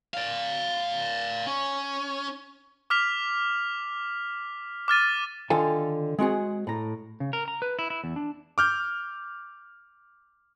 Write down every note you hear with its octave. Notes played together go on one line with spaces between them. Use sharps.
D5 F5
C#4
D6 F6 B6 F7
D6 F6 A6 D#7
D3 D#3 F4 A4 G#5
G#3 C4 F#4 G#4
A2 A#5
C#3
A#4
A#5
B4
E4
E4
E2
D4
D6 F6 G6